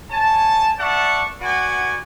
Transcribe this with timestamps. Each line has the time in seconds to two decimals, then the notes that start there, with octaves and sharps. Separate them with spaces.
0.11 C#5 G#5 A5
0.79 D5 E5 F#5 A5 C#6
1.40 F#4 B4 D5 F#5 G#5